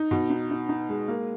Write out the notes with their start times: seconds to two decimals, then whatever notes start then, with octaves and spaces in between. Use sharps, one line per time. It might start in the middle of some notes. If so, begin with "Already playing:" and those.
Already playing: D#4
0.11 B2
0.30 D#4
0.51 D#4
0.69 D#4
0.89 G#3
1.08 A#3